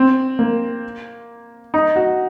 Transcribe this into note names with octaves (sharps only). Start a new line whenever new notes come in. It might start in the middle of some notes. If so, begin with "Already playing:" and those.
Already playing: C4
A#3
D#4
F#4